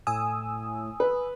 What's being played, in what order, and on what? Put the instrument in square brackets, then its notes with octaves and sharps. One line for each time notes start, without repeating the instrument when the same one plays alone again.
[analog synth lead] A2 [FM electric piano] G#5 D#6 E6
[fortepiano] B4